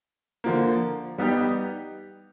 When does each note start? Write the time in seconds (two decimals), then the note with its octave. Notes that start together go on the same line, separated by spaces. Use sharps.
0.44 D3 F3 A#3
1.18 G3 B3 D#4 G4